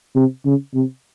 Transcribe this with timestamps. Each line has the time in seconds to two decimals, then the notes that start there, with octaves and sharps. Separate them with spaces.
0.15 C3
0.46 C#3
0.74 C3